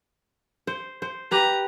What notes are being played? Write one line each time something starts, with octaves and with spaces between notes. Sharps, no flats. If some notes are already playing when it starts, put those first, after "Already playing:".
C5
C5
G4 B4 A#5